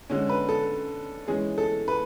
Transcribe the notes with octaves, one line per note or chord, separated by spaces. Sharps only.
D3 G#3 C#4
B4
A4
E3 G#3 C#4 G#4
A4
B4